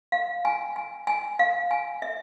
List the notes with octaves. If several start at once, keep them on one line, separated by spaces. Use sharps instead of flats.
F5
G#5
G#5
G#5
F5
G#5
E5